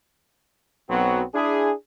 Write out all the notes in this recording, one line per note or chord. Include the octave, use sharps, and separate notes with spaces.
B1 F#3 B3 C4 F#4
D4 E4 G#4